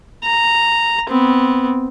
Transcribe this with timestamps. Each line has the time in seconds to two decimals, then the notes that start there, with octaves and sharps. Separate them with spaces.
0.24 A#5
1.09 B3 C4